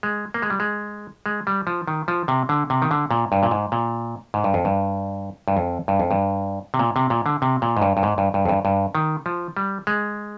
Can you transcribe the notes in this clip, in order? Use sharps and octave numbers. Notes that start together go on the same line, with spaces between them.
G#3
A#3
G#3
G3
G#3
G#3
G3
F3
D#3
F3
C3
D3
C3
D#3
D3
A#2
G2
A#2
G#2
A#2
G#2
G2
F2
G2
G2
F2
G2
F2
G2
C3
A#2
C3
A#2
D3
C3
A#2
G#2
G2
G2
G#2
G2
G2
F2
G2
G2
D#3
F3
G3
G#3